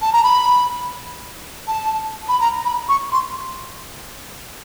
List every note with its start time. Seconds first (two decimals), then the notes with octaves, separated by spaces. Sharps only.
0.02 A5
0.13 A#5
0.24 B5
1.68 A5
2.28 B5
2.41 A#5
2.65 B5
2.89 C#6
3.12 C6